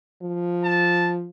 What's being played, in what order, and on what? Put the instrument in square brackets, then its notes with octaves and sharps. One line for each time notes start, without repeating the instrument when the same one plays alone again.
[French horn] F3
[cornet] A5